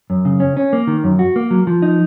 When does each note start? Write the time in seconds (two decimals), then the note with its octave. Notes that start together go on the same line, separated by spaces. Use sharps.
0.10 F#2
0.25 C#3
0.40 C#4
0.57 C#4
0.73 A#3
0.87 D#3
1.04 F#2
1.19 F#4
1.36 A#3
1.51 F#3
1.67 F3
1.82 D#4